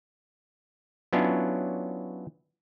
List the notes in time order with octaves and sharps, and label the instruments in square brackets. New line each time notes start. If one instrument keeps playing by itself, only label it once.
[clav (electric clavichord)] F#3 B3 C#4 D4 E4 F4